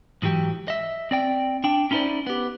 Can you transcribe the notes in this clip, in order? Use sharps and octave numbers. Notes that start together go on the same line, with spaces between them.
G#2 E3 F#3 G4
D#5 E5
C4 D5 G5
D4 G5
C#4 D#4 E4 A4 C5 D5
B3 G4